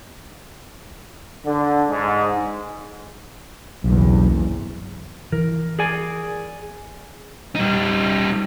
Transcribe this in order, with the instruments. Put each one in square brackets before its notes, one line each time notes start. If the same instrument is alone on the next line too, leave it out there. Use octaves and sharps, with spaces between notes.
[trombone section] D3
G#2
[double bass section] F#1 E2 G2 [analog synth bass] B1
[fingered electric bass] E3 [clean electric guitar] A#4
[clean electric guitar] G#4 D5 G#5
[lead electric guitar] G3 D#4